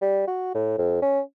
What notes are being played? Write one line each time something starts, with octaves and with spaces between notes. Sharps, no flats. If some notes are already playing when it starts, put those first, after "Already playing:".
G3
F#4
A2
F2
C#4